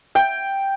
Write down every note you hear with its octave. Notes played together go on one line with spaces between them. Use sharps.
G5